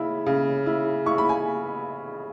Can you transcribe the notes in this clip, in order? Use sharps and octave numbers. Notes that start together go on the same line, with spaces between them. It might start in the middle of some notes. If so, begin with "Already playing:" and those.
Already playing: C#3 E4 B5
C#3
E4
E4 C#6
B5
G#5